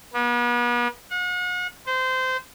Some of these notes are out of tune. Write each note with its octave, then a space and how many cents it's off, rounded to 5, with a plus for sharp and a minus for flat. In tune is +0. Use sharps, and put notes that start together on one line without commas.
B3 -40
F#5 -40
C5 -20